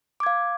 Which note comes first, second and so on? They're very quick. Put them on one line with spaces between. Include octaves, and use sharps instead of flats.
D6 G#6 F5